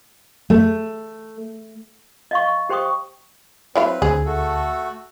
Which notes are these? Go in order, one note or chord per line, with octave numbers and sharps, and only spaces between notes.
A3
D#5 F5 C#6
G4 C5 G5 C#6 D#6
F#3 C4 E4 B4 F5
D2 G#4
A3 F#4 A4